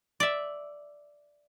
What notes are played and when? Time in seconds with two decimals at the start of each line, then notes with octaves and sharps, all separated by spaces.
0.20 D5 E5